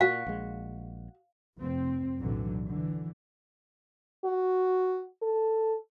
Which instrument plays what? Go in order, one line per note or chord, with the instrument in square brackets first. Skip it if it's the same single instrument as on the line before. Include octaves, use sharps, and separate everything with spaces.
[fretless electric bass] A#2 [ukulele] F#4 [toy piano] F5
[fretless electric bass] A#1 G#3
[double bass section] F1 C4
B1 A2 D3 E3 F#3
D3 E3
[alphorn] F#4
A4